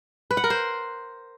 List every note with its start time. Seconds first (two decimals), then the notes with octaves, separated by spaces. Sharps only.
0.31 B4
0.37 F#5
0.44 A#4
0.50 C5